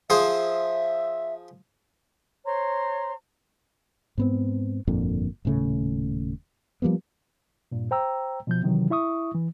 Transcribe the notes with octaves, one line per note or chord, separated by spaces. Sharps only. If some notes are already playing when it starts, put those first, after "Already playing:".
F3 G#4 C5 E5
C5 C#5 A#5 C6
G#2 B3 C4
G1 F2 A#2 D3
D#1 A2 C#3 A3
F3 G3 A#3 B3
G2 A#2
C5 G5 A#5 E6
B2 F3 G6
C3 D#3 E3 F#3
E4 E5 C#6 D#6
E3